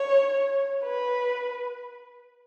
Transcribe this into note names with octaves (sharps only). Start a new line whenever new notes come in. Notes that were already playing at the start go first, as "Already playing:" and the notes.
Already playing: C#5
B4